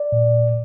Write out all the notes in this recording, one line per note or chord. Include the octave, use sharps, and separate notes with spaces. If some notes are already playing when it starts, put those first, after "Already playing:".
Already playing: D5
A#2